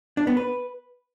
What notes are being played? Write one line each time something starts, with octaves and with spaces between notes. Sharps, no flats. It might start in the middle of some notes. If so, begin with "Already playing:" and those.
D4
B3
B4